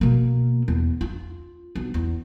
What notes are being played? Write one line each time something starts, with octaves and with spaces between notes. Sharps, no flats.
B2 A#3
E2
F4
B1
E2